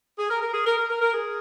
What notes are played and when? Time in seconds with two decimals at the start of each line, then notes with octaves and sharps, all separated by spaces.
0.17 G#4
0.29 A#4
0.40 A#4
0.52 G#4
0.66 A#4
0.77 A#4
0.89 A#4
1.01 A#4
1.12 G#4